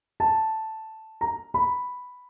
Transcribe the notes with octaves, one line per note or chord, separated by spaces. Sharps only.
A5
A#5
B5